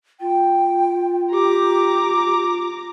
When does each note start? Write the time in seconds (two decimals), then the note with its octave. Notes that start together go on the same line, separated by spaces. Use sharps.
0.20 F4 G5
1.32 G4 A#5 D6